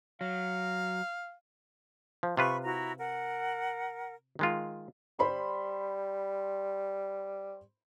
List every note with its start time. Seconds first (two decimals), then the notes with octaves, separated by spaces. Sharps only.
0.21 F#3 F5
2.23 F3
2.37 C3 F4 B4 B5 C#6
2.63 E4 F#4 A#5
2.99 A#4 F#5
4.39 D#3 G#3 F4
5.19 G3 C5 B5 C6